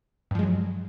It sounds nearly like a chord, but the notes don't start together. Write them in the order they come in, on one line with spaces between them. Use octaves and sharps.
G2 F3 G#3 F#3